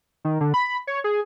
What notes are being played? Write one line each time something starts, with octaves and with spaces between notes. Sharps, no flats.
D#3
D3
B5
C#5
G#4